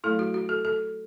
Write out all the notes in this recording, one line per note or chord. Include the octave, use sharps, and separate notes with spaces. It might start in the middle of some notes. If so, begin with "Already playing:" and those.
F#3 A3 E4 A4
F#4
F#4
A4
A4